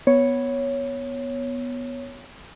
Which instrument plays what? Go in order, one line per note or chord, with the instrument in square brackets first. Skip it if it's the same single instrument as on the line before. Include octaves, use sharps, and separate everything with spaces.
[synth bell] B3 C#5